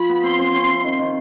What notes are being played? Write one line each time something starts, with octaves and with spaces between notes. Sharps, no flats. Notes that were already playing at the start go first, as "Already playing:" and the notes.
Already playing: F3 B5
B3
C4 C6
C4
C4
E4
D#3
D#3